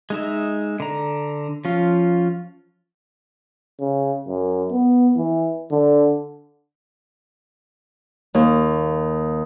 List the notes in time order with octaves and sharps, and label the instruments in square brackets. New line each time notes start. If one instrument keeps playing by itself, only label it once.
[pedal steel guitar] G#3 D#4 E5
D3 A#5
F3 C#4 F4
[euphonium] C#3
F#2
B3
E3
D3
[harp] D#2